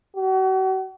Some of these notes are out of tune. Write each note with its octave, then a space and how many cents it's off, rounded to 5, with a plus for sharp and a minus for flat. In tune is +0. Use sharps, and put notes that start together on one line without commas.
F#4 +40